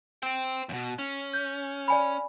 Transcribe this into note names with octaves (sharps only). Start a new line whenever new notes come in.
C5 G5
E2 B2
C#4
G6
D5 G#5 B5